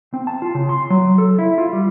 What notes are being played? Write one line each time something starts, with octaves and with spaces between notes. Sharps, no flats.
C4
A5
F4
C#3
C6
F#3
A4
E4
F4
G3